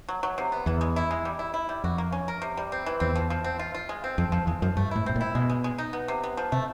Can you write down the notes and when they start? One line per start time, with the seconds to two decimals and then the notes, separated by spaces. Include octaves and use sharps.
0.09 F#3
0.23 F#3
0.38 C3
0.52 B3
0.66 E2 E3
0.81 G#3
0.96 E4
1.11 G#3
1.25 G3
1.39 E4
1.54 E4
1.69 G3
1.84 F2 F#4
1.98 A#3
2.12 C#4
2.28 A#4
2.42 C3
2.57 G3
2.72 C4
2.86 E3
3.00 E2 C4
3.15 F3
3.30 F3
3.44 C4
3.59 F4
3.74 F4
3.89 G#3
4.04 C4
4.18 F2 F3
4.32 F2 F3
4.47 E2 G#3
4.62 F#2 F3
4.77 G2 A3
4.91 A2 E4
5.06 A2 C4
5.16 A#2
5.21 E4
5.35 B2 G#3
5.50 G#3
5.64 G#3
5.78 D#4
5.93 B3
6.08 C3
6.23 B3
6.37 F3
6.52 C3 A3